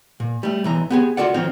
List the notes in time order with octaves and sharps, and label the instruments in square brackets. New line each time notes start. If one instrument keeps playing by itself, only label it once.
[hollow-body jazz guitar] A#2
G3 A3
B1 E3 A#5
B3 G4 G#4
F4 F#4 A4 D5 F#5
D#3 F3 C4 D#4 C#5